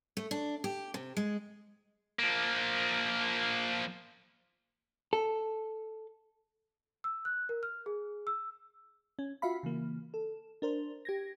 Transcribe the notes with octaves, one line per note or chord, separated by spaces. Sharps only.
A3
D4
G4
C3
G#3
F3 A#3
A4
E6
F#6
A#4
F6
G#4
E6
C#4
F4 F#4 E5 F5 B5
C#3 E3 A#3
A4
D4 A#4 C5
G4 G#6 A#6